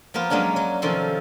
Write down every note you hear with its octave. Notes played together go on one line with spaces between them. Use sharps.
F3 A#3 B3 F4
F#3 G#3 A#3 C#4 D4
F#3
C3 D#3 F3 C#4 A4 C6